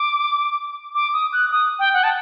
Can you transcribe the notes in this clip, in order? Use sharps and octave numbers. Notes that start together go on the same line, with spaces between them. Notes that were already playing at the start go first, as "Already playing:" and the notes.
Already playing: D6
D6
D#6
F#6
D#6
G5
F#5
A5